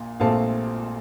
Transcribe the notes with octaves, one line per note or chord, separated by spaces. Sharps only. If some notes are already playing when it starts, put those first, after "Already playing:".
Already playing: A#1 A#2
A#1 A#2 A3 C4 F5 A5